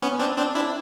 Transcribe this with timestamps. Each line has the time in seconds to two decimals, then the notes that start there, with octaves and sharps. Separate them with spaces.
0.02 B3 C#4
0.20 C4 D4
0.37 C4 D4
0.55 D4 E4